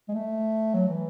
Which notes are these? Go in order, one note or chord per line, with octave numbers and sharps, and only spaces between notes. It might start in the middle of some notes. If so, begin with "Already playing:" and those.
G#3
A3
F#3
E3